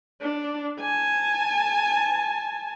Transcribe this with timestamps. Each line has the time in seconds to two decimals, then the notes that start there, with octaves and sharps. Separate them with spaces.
0.22 D4
0.81 G#5 A5